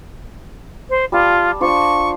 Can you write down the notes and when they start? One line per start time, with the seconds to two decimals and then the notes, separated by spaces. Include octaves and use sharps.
0.89 C5
1.12 G3 F4 A5
1.61 D4 F4 C5 C#6